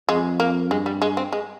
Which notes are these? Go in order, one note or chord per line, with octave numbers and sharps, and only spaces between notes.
F2 G#3
A#3
G2 G#3
G3
G#3
C4
G#3